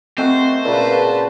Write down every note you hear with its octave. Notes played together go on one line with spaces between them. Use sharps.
A3 C4 F#4 A#4 C5 D#5 G5
A#2 C#3 F#4 A#4 B4 A5